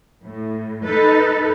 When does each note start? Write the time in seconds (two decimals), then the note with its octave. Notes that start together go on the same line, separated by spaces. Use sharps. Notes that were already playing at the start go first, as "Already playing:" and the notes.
0.23 A2
0.84 D#4 A4 B4